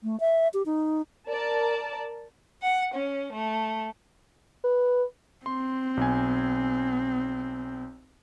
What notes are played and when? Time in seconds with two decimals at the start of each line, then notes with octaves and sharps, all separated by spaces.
0.03 A3
0.20 E5
0.54 G4
0.66 D#4
1.28 A#4 D5 A5
2.62 F#5
2.93 C#4
3.33 A3
4.64 B4
5.46 C4 C6
5.97 B1 G#5